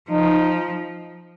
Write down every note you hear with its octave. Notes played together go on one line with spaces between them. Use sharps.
F3 D#4